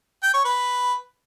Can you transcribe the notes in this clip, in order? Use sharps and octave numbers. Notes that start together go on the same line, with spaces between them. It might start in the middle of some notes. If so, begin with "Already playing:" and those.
G5
C#5
B4